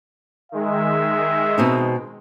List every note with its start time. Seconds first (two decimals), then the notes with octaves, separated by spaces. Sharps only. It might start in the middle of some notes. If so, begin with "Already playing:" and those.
0.52 D#3 G#3 E5
1.58 B2 C4 D#4